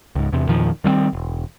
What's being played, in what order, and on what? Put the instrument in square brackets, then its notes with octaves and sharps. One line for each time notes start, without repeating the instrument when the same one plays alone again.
[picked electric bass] C#2 G#2
E2 C3
E2 A#2 D#3 F3
D#3 G3 A3 C4
E1